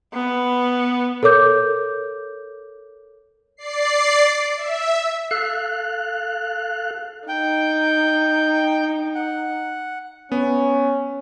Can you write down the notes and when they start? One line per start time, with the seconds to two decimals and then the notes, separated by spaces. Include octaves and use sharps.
0.13 B3
1.23 A4 A#4 C#5 D6 G6
3.57 D5 C7
4.56 E5
5.31 A4 F5 F#6
7.29 D#4 G5
9.15 F#5
10.32 B3 C#4